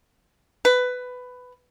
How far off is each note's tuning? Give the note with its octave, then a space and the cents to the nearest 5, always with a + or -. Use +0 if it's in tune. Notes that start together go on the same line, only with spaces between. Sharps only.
B4 +15